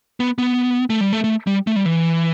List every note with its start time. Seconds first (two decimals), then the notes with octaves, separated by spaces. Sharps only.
0.20 B3
0.38 B3
0.90 A3
1.01 G3
1.13 A3
1.24 A3
1.47 G3
1.67 A3
1.76 G3
1.85 E3